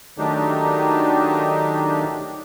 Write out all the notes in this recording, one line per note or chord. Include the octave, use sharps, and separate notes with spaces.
D#3 F#3 A3 D4 D#4 G4